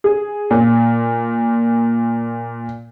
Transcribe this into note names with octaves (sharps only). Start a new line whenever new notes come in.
G#4
A#2